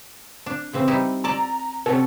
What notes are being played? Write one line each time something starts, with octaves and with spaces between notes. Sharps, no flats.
D4
C#3 E3 C4
G3 D#4 E4
A4 D5 A5 A#5
C3 F#3 C#4 A4